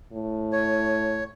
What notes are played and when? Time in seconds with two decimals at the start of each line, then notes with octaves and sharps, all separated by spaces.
0.13 A2
0.52 C#5